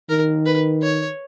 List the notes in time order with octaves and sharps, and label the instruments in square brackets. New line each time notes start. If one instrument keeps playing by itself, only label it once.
[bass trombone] D#3 [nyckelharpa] A#4
[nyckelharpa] B4
C#5